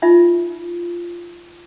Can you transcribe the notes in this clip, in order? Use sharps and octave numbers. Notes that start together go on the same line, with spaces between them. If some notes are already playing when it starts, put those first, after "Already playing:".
D#4 F4 E5